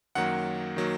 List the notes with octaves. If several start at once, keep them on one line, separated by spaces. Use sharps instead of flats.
F#2 D#3 F#3 A#3 F#5
D#3 F#3 A#3